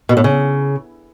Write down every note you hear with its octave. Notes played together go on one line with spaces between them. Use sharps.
B2
A2
C#3